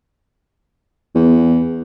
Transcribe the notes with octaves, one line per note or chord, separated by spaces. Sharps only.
E2